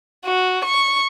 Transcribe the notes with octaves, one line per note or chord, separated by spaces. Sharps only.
F#4
C#6